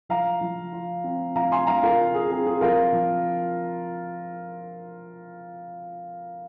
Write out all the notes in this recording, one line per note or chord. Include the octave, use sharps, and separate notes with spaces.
F3 F5 A#5
F3
F4
C4
F3 F5 A#5
G#5 C6
F3 F5 A#5
F4 A#4
F4
G#4
C4 G#4
G#4
F3 F4 A#4
F3